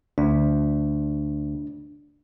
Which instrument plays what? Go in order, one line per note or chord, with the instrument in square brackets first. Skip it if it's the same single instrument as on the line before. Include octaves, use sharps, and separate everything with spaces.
[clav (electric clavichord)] D2 [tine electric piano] D4